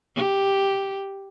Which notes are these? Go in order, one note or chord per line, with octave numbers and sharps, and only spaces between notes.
G4